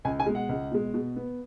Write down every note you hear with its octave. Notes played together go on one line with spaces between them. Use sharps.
C#2 G#5
G#5
B2 G#3
F#5
C#2
B2 G#3
B2
B3